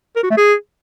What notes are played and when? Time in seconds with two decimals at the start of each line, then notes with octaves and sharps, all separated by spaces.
0.16 A#4
0.23 F#4
0.31 A3
0.38 G#4